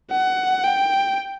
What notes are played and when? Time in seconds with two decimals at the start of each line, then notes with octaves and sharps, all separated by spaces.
0.12 F#5
0.63 G5